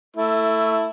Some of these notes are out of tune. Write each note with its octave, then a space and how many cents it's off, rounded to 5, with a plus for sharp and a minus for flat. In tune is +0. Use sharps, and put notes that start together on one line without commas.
A3 +15 E4 +0